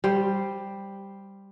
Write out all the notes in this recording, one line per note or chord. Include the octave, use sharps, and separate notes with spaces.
G3 C5